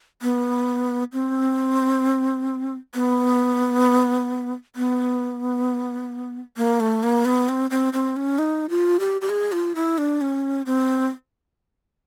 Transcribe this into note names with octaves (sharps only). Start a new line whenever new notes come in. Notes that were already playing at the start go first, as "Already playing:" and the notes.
B3
C4
B3
B3
A#3
A3
A#3
B3
C4
C4
C4
C#4
D#4
F4
G4
G4
G#4
F4
E4
D4
C#4
C4